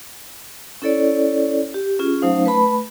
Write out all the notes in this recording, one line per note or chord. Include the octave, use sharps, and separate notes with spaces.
C#4 E4 A4 C#5 D5
G4
C#4 F4 G#4
F#3 A3 C#4 D#4 C5 F5
A3 B4 A5 B5